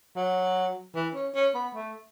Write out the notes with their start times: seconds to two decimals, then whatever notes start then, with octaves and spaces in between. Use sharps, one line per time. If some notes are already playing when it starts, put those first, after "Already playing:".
0.16 F#3
0.95 E3
1.15 C#4
1.34 C#4
1.55 B3
1.75 A3